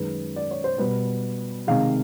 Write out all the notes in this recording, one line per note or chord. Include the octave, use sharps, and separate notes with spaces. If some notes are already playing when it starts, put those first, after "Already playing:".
Already playing: F#2 D#3 G#3 B4
D5
C#5
C5
B2 G3 B4
C3 D#3 G#3 F5